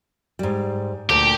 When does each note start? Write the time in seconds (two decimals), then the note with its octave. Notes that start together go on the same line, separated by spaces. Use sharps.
0.39 G#2 G3
1.10 D2 A#2 G4